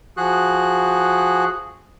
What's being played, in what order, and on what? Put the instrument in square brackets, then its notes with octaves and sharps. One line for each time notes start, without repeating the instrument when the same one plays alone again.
[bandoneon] F3 F#4 G#4 F#6